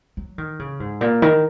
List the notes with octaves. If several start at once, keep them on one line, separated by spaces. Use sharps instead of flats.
F#3
D#3
C#3
G#2
A#2
D#3